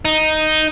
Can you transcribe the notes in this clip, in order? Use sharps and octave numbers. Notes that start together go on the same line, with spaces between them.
D#4